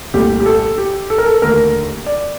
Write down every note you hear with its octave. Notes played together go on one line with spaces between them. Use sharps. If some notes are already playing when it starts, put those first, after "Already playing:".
C2 A#2 A3 G4
G4
A4
G4
A4
A#4
A4
D#2 D3 A3 A#4
D5